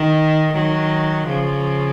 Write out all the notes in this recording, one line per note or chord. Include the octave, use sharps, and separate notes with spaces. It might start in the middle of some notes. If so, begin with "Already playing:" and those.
Already playing: D#3
D#3 F#3
C#3 F3